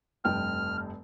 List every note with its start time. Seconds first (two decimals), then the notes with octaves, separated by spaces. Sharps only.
0.25 F1 G2 G5 F6